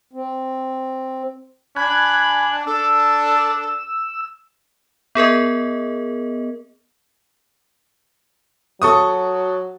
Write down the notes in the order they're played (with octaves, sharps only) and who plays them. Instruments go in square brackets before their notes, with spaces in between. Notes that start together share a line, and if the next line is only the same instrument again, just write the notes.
[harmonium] C4
[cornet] D4 [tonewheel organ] G#5 F#6 [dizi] B5
[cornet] D4 [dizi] A4 [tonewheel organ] E6
[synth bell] B3 G#4 A#4 D#5
[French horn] F#3 [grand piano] A4 C#6 D#6